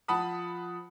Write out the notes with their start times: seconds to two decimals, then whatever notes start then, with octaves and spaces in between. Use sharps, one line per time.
0.08 F3 F#5 A5 B5 D#6